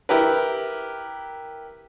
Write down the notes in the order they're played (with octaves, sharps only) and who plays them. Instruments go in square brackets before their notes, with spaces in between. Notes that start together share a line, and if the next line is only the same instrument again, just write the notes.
[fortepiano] E4 G4 A#4 B4